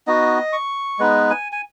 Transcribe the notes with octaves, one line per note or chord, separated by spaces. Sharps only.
B3 D#4 F#4 D#5
C#6
G#3 B3 D#4 B4
G#5
G#5